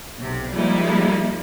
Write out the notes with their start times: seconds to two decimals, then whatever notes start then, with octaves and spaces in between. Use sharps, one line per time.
0.17 B1 C3
0.52 F3 G3 G#3 A#3 D#4 E4